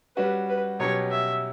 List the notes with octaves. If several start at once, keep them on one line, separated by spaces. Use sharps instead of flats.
G3 C#4 F#4 B4
B4
B2 F#3 C#4 G4 C#5
E5